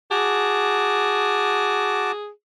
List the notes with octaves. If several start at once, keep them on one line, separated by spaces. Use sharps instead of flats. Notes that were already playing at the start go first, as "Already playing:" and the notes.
F#4 G#4 A5 D6